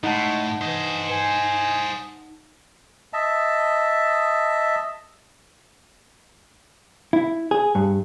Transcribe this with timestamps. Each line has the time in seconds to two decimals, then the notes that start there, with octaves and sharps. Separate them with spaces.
0.04 A2 G#3 D#4 F#5 A5
0.61 E3 C5 D#5
1.11 G#5
3.13 D#5 E5 A5
7.13 E4
7.51 G#4
7.75 G2